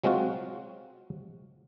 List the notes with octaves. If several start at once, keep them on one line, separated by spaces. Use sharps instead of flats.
F#3 G#3 C4 F4 F#4